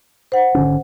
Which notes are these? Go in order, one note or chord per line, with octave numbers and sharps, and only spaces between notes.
C5 F#5
G#1 D3 C#4